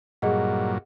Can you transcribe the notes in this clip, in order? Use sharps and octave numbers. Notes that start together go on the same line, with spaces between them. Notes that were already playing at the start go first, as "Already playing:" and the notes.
G2 A#2 F#3 G#4 D#5 F#5